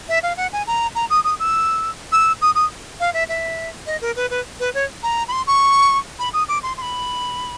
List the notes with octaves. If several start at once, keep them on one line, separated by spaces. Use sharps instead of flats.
E5
F5
F#5
G#5
A#5
A#5
D#6
D#6
E6
E6
D#6
D#6
F5
E5
E5
D#5
A#4
B4
B4
B4
C#5
A#5
B5
C6
C#6
B5
D#6
D6
C6
C6
B5